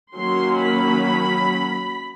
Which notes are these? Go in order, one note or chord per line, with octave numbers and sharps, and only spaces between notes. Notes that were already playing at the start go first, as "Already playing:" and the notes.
D#3 F#3 A#3 C#4 C6
B5